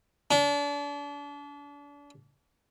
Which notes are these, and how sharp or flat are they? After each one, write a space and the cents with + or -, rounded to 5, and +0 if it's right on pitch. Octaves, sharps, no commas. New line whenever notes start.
D4 -35